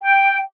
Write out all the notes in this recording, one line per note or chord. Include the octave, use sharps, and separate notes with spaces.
G5